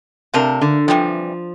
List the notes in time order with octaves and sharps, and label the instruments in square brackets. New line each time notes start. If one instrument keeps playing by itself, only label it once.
[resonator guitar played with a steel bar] C3 [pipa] A3 D4 F4 A#4
[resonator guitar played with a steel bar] D3
[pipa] C3 E3 G3 [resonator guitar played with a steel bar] F3